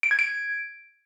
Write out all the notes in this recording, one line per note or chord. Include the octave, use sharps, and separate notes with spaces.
D7
G#6
D7